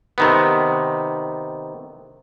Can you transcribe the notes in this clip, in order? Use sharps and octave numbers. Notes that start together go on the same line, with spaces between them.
C3 D#3 B3